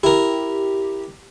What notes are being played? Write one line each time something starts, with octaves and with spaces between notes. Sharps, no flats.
E4 G4 A#4